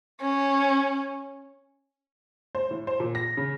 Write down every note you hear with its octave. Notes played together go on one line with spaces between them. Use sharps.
C#4
C5
A2
C5
A#2
A#6
C#3